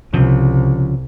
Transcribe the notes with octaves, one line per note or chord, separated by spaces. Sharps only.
C2 C#3 F3